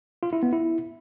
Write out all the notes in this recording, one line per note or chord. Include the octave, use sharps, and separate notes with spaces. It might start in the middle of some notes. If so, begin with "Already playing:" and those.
F4
E4
B3
E4